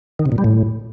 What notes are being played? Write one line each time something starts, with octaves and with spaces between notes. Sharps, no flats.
D#3
C3
A#2
G3
A2